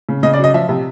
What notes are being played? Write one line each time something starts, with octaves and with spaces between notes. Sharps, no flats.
C#3
C#3 D#5
D5
F#3 D#5
F3 E5
C3